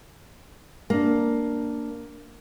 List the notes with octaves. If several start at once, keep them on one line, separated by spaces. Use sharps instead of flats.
A#3 D4